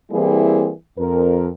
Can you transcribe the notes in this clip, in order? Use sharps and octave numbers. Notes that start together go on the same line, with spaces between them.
E3 G3 A#3 C4 E4 G#4
F2 A#4